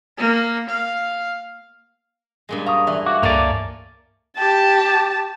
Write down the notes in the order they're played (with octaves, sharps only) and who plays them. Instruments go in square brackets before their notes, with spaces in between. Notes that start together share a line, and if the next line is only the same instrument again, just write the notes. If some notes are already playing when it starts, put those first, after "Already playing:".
[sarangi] A#3
F5
[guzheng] G2 A#2 G#3
[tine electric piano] F5 C#6 D#6 [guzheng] A#5
[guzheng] E3 [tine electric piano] D5 E5
[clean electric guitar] F#4 [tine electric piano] F5 D6
[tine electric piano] C#2 G2 [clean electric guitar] A#3 D5 [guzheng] A4 C#5 G#5
[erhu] G4 [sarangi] A5